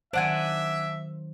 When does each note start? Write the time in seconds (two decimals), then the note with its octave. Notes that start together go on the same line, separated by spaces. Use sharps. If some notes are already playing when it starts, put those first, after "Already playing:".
0.13 D#3 F#3 D4 C5 E5 F#5 G#5